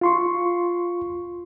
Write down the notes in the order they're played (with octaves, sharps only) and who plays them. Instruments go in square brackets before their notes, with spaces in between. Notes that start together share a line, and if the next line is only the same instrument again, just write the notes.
[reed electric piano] F4 C6 C#6